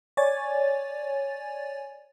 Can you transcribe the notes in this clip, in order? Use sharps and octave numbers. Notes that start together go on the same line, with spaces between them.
C#5 D5 G#5 A6